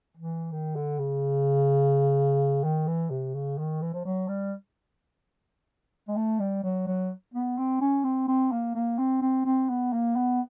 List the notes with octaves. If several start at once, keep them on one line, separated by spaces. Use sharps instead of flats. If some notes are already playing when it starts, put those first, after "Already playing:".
E3
D#3
D3
C#3
D#3
E3
C3
C#3
D#3
E3
F3
F#3
G3
G#3
A3
G3
F#3
F#3
B3
C4
C#4
C4
C4
A#3
A#3
C4
C4
C4
B3
A#3
B3